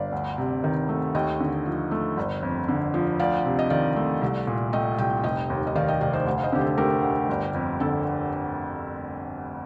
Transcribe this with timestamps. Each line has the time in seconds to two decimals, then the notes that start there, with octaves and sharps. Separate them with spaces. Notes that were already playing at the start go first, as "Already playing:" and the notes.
Already playing: G1 D5 F5
0.12 D2
0.38 C3
0.64 D#3
0.89 A3
1.15 D#2 D#5 G5
1.40 D3
1.66 F3
1.91 A3
2.17 G1
2.43 F2
2.68 D3
2.94 F3
3.19 D2 D5 F5
3.45 C3
3.59 D#5
3.70 D#3 D5 F5
3.96 A3
4.22 C2
4.47 A#2
4.73 A3 D#5 G5
4.99 C2 G5
5.24 F1 D#5 G5
5.50 D#2
5.67 D#5
5.75 D#3 D5 F5
5.88 D#5 G5
6.01 F1 D5 F5
6.13 C5 D#5
6.27 D2
6.38 F5
6.44 C5 D#5
6.52 D3 G4
6.61 A4
6.78 A3 G4 A#4
7.03 D2
7.29 G1
7.54 F2
7.80 D3 A4